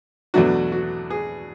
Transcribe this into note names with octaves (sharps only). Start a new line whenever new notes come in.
E2 B2 F#3 A3 D4 F#4
F#4
G#4